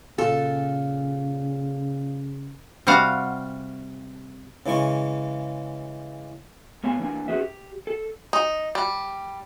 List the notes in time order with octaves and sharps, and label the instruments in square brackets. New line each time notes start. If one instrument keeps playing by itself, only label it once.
[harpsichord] A#2 F4 [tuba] C#3 [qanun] A4
[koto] C3 G3 F#4 F5 F#5
[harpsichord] C#3 E3 G#3 C#6
[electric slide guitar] A2 B3 C#5 F5 G#5 A5
E3 A#3 D4 E4 G#5
C#4 F#4 G#4 B4 E5
G4
A4
[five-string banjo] D#4
G3